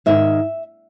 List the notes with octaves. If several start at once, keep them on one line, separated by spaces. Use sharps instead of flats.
G#2 D#3 E5